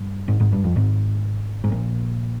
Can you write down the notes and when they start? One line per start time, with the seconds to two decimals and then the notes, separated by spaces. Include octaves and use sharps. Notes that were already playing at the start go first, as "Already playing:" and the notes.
Already playing: G2
0.28 G#1 G#2
0.40 G#1 G#2
0.52 G2
0.64 F2
0.76 G#1 G#2
1.64 G#2
1.71 A#1 A#2